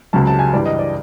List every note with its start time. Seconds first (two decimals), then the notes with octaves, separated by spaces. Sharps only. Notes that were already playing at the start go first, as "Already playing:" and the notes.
0.13 C#2 C#3 F#3 A5
0.27 A5
0.39 G#5
0.53 G2 E3 G3 D5
0.66 D#5
0.79 D5